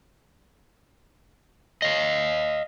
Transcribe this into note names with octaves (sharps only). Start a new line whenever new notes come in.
D#5 F5